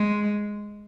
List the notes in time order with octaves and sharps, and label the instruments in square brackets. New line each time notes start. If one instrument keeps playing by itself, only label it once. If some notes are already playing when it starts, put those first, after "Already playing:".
Already playing: [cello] G#3